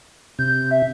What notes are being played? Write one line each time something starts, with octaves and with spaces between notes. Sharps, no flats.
C3 G6
E5